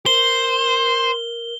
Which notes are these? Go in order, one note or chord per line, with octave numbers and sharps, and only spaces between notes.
A#4 C5 G7